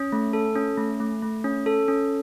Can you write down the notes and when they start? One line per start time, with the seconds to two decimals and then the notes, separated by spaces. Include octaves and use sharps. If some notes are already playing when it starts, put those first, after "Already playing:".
Already playing: C#4
0.12 A3
0.33 A4
0.55 C#4
0.78 A3
1.00 A3
1.22 A3
1.44 C#4
1.66 A4
1.88 C#4